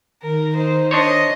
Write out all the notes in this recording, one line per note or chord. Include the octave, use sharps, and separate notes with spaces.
D#3 A#4
D#4 C5
D4 C5 C#5 D#5